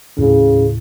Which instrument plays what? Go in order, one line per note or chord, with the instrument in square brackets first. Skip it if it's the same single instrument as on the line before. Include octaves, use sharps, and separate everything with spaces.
[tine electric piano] D#2 A2 [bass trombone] C#3